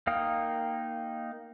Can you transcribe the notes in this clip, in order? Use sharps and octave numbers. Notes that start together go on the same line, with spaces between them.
A#3 D#4 F5 G5 D#6